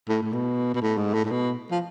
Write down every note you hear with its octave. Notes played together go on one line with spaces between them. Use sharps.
A2
A2
B2
B2
A2
G#2
A2
A2
B2
F3